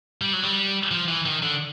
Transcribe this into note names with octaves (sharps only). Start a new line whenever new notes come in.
G3
F#3
G3
F3
E3
D#3
D3